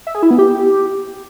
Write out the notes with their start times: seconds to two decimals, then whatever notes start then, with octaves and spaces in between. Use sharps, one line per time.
0.07 E5
0.15 G#4
0.23 E4
0.31 B3
0.39 G4